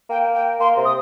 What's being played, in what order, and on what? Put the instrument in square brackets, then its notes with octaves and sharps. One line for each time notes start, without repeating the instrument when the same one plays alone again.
[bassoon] A#3 [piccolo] G5
[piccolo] G5
[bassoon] A#3 [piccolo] C6
[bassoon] C3
[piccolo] D#6